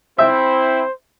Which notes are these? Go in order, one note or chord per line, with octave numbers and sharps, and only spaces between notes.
C4 E4 C5 E5